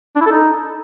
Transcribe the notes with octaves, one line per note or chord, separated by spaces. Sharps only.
D4
E4
A4
D#4